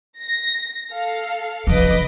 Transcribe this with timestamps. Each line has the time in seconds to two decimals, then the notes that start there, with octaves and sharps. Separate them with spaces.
0.20 A#6
0.92 A4 F5
1.67 C#3 F3 B4 D#5 D6